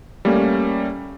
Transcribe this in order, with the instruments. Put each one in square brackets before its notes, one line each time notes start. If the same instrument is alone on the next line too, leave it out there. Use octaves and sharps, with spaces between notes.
[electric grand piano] G3 A3 A#3 C#4